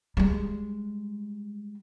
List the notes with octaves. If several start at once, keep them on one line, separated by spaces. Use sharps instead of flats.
G3 G#3